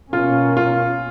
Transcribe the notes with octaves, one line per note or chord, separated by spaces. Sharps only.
B2 A#3 C#4 F4
F4